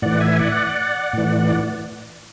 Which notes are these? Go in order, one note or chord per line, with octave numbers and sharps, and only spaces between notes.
A2 E3 D5 F#5
E5 G#5
D5 F#5
A2 E3